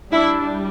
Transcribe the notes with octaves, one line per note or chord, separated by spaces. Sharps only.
G3 D4 E4 E5